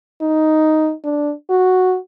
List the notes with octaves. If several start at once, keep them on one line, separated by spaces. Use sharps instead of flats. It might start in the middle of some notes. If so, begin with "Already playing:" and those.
D#4
D4
F#4